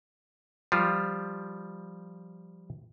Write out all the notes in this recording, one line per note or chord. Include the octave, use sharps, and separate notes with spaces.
F3 G3 F4